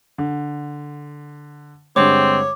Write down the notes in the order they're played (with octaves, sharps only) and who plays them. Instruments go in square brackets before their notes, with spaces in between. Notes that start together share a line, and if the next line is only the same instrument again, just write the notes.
[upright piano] D3
[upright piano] G2 D3 G#3 [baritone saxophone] C4 [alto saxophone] C#5 [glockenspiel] D6